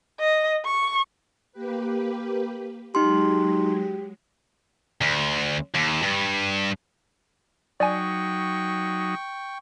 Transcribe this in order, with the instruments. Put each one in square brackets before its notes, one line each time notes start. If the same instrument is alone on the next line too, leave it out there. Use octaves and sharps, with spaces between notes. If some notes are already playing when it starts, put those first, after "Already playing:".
[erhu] D#5
C#6
[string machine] A#3 G4 B4
[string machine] F#3 G#3 [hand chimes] D#4 C6 [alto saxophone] G4
[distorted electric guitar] D2
D#2
G2
[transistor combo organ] F#3 D#4 [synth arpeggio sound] D5 G#5 [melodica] G5 C#6